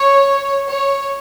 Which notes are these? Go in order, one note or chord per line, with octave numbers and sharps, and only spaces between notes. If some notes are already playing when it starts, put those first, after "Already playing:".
Already playing: C#5
C#5